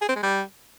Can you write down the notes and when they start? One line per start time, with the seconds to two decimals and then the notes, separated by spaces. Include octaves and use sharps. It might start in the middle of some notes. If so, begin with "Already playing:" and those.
0.02 G#4
0.09 C4
0.16 G#3
0.23 G3